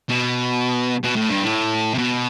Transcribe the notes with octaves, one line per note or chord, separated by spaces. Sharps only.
B2
B2
A2
G2
A2
C3
B2